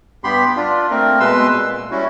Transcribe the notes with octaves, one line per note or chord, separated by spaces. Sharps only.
G2 B3 G4 B5 C6
D4 F4
A3 A#3 C4 A#4
B2 G#3 B4 C6 E6
A#2
G3 C#4 E4 F#4